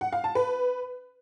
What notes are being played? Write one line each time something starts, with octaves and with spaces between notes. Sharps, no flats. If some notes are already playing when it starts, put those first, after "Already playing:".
F#5
F5
A5
B4